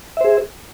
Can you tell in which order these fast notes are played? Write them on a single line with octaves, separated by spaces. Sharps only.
E5 C5 G#4